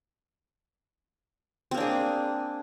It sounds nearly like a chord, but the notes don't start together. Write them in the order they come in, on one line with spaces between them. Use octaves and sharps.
C4 A#3 D4 G#4